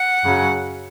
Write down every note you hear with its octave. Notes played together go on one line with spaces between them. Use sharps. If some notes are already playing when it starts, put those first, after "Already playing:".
Already playing: F#5
F#2 C#3 F#3